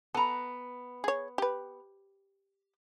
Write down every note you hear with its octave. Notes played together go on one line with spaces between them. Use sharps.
B3 A4 A#5
G#4 C#5
G4 B4